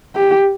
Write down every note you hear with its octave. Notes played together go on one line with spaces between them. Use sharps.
G4